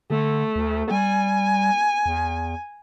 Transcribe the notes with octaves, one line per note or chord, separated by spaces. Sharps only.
D3 A3
D2
G3 G#5
E2